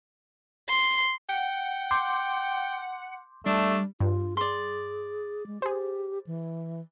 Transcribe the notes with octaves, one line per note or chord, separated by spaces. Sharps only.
C6
F#5 G5
C6 D6 G6
G3 A3 D4
G2 F4
G#4 D5 C6
G#3
G4 G#4 C5
E3